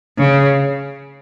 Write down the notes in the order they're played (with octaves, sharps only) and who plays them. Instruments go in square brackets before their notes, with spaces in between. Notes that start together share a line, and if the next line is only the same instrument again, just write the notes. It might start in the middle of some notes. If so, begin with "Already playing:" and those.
[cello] C#3